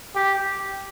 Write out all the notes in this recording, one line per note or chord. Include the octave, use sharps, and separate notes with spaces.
G4